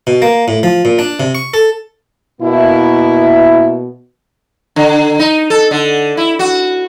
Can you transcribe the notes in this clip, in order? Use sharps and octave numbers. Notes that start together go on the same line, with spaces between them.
B2
A#3
A2
F3
A#2
D4
C3
C#6
A4
B2 A#3 E4
D3
D#4
A4
D3
E4
F#4